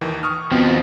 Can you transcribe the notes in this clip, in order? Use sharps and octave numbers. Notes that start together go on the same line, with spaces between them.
D#2 D#3 E3
C#6 D#6 F6
D#2 B2 F3 C4